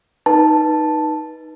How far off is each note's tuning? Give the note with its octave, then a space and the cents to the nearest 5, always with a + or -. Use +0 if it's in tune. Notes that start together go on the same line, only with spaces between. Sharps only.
D#4 +0 B4 -25 A5 +0